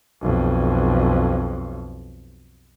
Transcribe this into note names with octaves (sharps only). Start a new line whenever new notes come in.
B1 F2